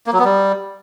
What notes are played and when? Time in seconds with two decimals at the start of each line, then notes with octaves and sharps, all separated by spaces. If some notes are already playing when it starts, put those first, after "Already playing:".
0.07 A#3
0.13 F#3
0.19 B3
0.25 G3